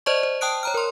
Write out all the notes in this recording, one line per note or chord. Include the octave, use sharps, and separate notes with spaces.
C5 D5 D#5 A5 C#6
C5
G5 A5 D#6 F#6 D7
C#5 A#5 F6
A#4 C6